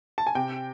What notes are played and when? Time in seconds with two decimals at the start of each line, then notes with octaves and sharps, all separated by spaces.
0.18 A5
0.27 G#5
0.35 C3 G5